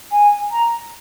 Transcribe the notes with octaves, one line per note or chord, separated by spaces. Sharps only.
G#5
A#5